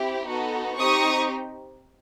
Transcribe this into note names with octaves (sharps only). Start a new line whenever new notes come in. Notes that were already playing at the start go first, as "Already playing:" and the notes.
Already playing: C4 E4 G4
B3 D#4 F#4 A4
C4 D#4 G4 C#6 D#6